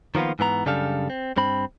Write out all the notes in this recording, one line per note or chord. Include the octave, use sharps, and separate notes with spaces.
D#3 F3 A#3 B3 F4
G#2 E3 B3 A#5
F#2 C#3 G3 D4 A4 F5
C4
G2 C4 B5